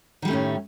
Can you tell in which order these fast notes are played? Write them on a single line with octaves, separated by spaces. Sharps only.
D#3 G3 A3 C#4 A2